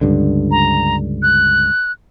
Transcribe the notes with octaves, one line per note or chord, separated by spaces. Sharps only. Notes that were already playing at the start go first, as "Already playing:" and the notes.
C#2 G2 D3
A#5
F#6